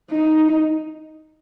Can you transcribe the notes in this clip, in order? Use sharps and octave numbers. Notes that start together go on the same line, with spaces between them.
D#4